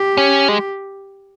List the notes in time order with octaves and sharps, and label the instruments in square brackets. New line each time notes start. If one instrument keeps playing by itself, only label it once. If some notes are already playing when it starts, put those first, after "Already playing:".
Already playing: [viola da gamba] G4
[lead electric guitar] C#4
G#3